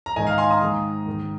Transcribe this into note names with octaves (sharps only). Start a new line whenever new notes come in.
A#5
G#2 D#3 D#5 G#5
F5 A#5
G#5 C6
A#5 D#6
G#2 D#3
G#2 D#3